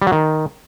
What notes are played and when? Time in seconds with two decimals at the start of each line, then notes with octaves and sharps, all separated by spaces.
0.02 G3
0.07 F#3
0.12 D#3